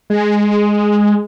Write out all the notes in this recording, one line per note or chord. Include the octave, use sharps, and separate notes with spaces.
G#3